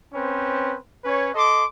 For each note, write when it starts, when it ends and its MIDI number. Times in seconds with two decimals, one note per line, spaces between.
0.14 0.76 60
0.14 0.76 61
0.14 0.76 71
0.14 0.76 72
1.05 1.30 61
1.05 1.30 71
1.05 1.30 73
1.34 1.64 69
1.34 1.64 75
1.34 1.64 84
1.34 1.64 86